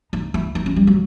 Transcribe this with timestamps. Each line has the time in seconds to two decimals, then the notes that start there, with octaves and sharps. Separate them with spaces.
0.13 D#4
0.34 E4
0.55 D#4
0.66 C#4
0.76 G3
0.87 F#3